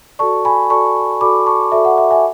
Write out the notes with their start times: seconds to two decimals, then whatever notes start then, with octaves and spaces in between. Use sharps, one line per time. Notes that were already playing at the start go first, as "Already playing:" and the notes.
0.19 F#4 A4 D5 A5 C#6
0.45 G#5 B5
0.70 F#4 A4 D5 A5 C#6
1.21 F#4 A4 D5 B5 D6
1.46 A5 C#6
1.72 F#4 A4 D5 E5
1.85 F#5
1.98 E5
2.11 E5 G#5